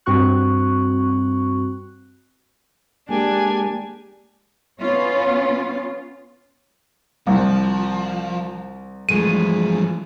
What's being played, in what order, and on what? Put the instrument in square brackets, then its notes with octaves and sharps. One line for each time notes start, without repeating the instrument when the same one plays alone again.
[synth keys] G2 C4 F#4 C#6 F#6
[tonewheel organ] G#3 A#3 [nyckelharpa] D4 [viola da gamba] G4 [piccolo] G#5
[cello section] B3 C#4 F4
[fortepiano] C2 [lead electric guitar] F3
[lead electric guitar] G2 E3 [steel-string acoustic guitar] F3 G#3 A3 [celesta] D#7